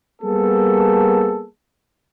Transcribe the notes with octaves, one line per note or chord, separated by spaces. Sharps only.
G3 A#3 B3 G#4 A4